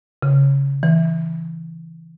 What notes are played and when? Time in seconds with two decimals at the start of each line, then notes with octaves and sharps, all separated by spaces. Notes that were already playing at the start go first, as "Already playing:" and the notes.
0.23 C#3
0.83 E3